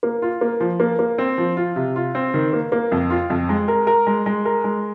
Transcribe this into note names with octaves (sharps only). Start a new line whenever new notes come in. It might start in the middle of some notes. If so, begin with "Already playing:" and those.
A#3
F4
A#3
F3
A#3
A#3
C4
F3
F4
C3
F4
C4
D#3
A#3
A#3
F2
F4
F2
G#3
A#4
A#4
G#3
G#3
A#4
G#3